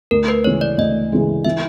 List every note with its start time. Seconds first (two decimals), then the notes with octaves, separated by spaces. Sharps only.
0.11 D2 A#4
0.28 B4
0.44 C#3 E3 G#3 C#5
0.61 D5
0.78 D2 D#5
1.12 C#3 E3 G#3
1.45 E3 E5